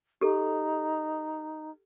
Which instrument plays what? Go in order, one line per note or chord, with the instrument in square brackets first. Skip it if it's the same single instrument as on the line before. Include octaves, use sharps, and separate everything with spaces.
[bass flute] D#4 [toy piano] G4 A4